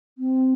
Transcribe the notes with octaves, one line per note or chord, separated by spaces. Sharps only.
C4